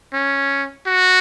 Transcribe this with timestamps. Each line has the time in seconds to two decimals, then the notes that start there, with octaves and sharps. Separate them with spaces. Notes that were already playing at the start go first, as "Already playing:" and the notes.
0.13 C#4
0.87 F#4